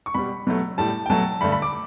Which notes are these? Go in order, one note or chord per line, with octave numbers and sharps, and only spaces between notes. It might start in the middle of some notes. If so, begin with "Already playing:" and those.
C#6
B2 G3 B5
B2 F#3 A3
A2 G3 A5
G5
B2 F#3 A3 A5
G2 D3 A3 B5
B5
D6